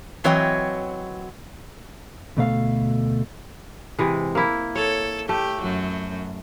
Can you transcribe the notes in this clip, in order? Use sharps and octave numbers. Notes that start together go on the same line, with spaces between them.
E3 F#3 C4 C#5 D#5 G5
D2 B2 A3 F5
C3 E3 G#3
A#3 E4
A4 C#5
A3 G4
F#2 F#3